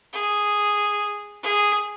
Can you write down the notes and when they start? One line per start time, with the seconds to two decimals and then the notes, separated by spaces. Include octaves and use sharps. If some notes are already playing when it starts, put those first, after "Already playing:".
0.13 G#4
1.43 G#4